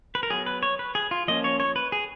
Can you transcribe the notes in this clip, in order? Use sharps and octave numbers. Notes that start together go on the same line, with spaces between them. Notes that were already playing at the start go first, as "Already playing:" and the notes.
B4
A#4
F#3 B3 G#4
B4
C#5
B4
G#4
F4
F3 A#3 C#4 D#5
C#5
C#5
B4
G#4